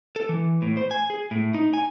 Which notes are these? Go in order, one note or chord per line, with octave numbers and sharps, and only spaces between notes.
A4
E3
A2
C5
G#5
G#4
A2
D#4
G#5